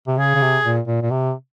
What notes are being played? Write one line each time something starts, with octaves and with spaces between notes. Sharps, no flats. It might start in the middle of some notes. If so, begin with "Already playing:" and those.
C3
C#3 G#4
C#3
C3
A#2
A#2
A#2
C3